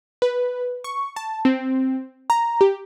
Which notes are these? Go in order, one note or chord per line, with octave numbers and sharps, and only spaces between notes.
B4
C#6
A5
C4
A#5
G4